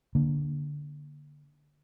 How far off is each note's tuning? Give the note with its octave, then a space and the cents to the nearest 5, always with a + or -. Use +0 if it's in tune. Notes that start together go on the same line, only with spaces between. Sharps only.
D3 +0 A#3 +10